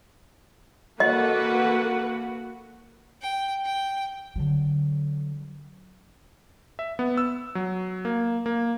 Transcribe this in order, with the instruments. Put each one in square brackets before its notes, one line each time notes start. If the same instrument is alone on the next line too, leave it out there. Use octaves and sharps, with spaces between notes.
[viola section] A#3 A4 B4 [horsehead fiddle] F#4 F#5 [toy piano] D#5
[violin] G5
G5
[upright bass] D3 F#3
[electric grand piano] E5
B3
E6
F#3
A#3
A#3